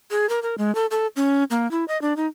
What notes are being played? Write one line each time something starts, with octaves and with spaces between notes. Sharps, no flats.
G#4
A#4
A#4
G#3
A4
A4
C#4
A#3
E4
D#5
D4
D#4